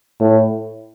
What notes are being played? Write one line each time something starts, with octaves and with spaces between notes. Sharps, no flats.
A2